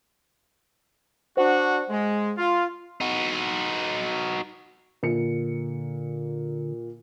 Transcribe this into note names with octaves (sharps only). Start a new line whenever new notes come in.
D4 F#4 C5 F#5
G#3
F4
D#4 F#4
A#2 D3 C#7